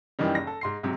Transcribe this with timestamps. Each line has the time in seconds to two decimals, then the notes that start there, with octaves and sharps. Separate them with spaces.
0.19 F#2 D#3 E3 G3 D#4
0.35 F#1 A#6
0.47 A4
0.61 G#2 C6 C7
0.83 G#2 C3 F#3